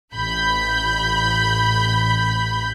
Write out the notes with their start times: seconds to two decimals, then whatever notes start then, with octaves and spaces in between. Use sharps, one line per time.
0.14 A1 B5 G6